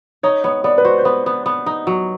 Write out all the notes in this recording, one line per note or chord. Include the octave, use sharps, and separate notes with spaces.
D#4 C#5
B3 C#5
B3 D5
B4
F#4 C5
C5
B3 B4
B3
B3
D#4
F#3